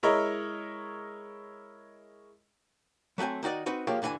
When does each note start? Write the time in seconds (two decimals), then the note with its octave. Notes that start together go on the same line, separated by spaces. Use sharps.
0.03 G#3 E4 A#4 C#5 D#5
3.18 F#3 A3 A#3 C4 G#5
3.43 D#3 D#4 F#4 D5 D#5
3.66 C4 D#4 F#4 B4
3.87 F3 G#3 A#3 F4 G4 C#5
4.02 G2 D3 E3 A4 G#5